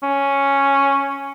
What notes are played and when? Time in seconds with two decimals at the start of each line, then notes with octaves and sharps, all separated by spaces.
0.03 C#4